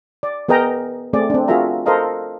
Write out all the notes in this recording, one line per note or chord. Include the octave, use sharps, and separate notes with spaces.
D5
B3 G#4 A#4 D#5 G5 A#5
A3 C4 G#4 D5
C4 D4
F4 F#4 G#4 A#4 E5 A#5
A4 A#4 C5 D#5 F5 A#5